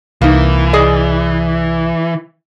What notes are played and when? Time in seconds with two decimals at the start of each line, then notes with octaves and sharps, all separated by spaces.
0.22 C2 E3 A#3 D#4
0.73 G#4 D5 D#5